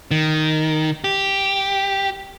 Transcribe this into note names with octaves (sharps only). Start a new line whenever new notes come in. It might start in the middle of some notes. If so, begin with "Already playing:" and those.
D#3
G4